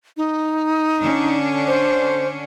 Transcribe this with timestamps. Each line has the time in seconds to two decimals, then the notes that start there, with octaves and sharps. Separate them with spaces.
0.17 D#4
1.02 D3 C#4 D4
1.67 C5